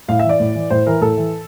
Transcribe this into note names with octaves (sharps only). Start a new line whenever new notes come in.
A2 F5
E5
E3
D5
A2
E3
A2 C5
E3 A#4
A2 A4
E3